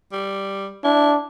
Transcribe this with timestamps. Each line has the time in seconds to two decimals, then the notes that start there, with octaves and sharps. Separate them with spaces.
0.12 G3
0.84 D4 E4